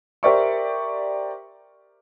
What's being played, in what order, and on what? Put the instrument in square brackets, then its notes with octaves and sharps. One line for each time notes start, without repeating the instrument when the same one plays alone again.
[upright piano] G4 A#4 C5 D5 E5 C#6